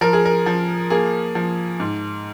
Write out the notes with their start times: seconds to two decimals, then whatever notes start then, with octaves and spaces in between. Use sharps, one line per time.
0.01 F3 A#4
0.13 G#4
0.25 A#4
0.46 F3
0.90 A#3 G#4
1.35 F3
1.80 G#2